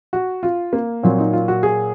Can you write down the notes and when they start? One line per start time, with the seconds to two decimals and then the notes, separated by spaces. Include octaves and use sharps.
0.13 F#4
0.43 F4
0.73 A#3
1.03 A#2 F#3 C4
1.19 D#4
1.33 F4
1.48 F#4
1.63 G#4